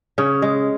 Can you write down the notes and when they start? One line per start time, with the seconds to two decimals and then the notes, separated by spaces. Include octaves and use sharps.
0.18 C#3 C#4
0.42 G#3